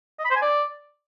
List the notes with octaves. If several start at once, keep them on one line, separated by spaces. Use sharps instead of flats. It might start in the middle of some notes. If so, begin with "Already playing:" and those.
D#5
B5
C5
G#5
D5